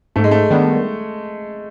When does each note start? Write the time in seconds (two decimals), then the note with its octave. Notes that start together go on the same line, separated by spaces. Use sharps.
0.16 G#2 A3
0.24 G#3
0.31 A3
0.51 D#3 G3 B3 D4